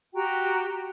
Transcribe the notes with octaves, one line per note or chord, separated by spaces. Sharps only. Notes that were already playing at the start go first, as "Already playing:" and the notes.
F#4 G4 G5 A#5